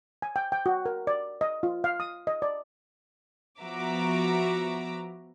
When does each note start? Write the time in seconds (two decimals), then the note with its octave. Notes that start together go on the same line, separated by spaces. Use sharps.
0.22 G#5
0.36 G5
0.52 G5
0.66 F#4
0.86 A#4
1.07 D5
1.41 D#5
1.63 F4
1.84 F5
2.00 D#6
2.27 D#5
2.42 D5
3.61 F3 B3 F#4 E5 A#5 D6